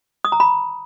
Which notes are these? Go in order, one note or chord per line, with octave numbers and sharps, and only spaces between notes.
D#6
A#5
B5